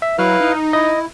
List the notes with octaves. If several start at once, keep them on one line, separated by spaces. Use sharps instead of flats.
E5
F#3 E4 B4 F5 F6
D#4
E4 D#5